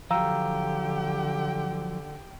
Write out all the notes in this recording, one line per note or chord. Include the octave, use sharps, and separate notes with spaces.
D3 F3 F#3 G4 F5 G5 A#5 E6